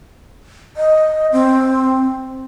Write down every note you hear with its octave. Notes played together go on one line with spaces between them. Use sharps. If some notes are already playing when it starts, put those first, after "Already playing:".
D#5
C4